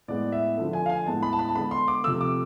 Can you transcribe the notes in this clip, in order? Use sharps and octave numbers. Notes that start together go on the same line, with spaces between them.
A2 G#3 B3 D5
E5
D3 F3 A3
G#5
F5
G#5
A2 G#3 B3 A5
B5
A5
B5
A5
D3 G#3 B3 B5
C6
D6
C3 F3 A3 E6
D6